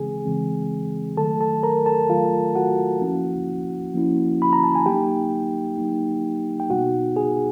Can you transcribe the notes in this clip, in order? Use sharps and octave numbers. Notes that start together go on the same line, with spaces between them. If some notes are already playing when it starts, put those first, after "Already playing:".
Already playing: C#3 E3 G#3 C4 G#4 G#5
C#3 E3 G#3 C4
D#3 F#3 A3 A4 A5
A4 A5
A#4 A#5
A4 A5
D#3 F#3 A3 F4 F5
F#4 F#5
F3 A#3 C#4 E4
F3 A#3 C#4 E4
B5
A#5
A5
G#5
F#3 A#3 D#4 G4 G5
F#3 A#3 D#4
G5
B2 G3 B3 D#4 F#4 F#5
G#4 G#5